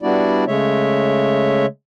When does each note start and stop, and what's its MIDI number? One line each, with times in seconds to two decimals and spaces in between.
0.02 0.45 55
0.02 0.45 59
0.02 0.45 62
0.02 0.45 64
0.02 0.45 66
0.02 0.45 74
0.47 1.66 49
0.47 1.66 56
0.47 1.66 57
0.47 1.66 73
0.47 1.66 76